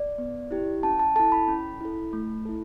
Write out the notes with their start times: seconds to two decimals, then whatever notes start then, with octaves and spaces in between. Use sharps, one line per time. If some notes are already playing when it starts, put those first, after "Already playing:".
Already playing: D5
0.18 B3
0.51 E4 G4
0.83 C#4 A5
1.00 A5
1.16 E4 A4 A5
1.32 B5
1.48 C#4
1.81 E4 A4
2.13 A3
2.45 E4 A4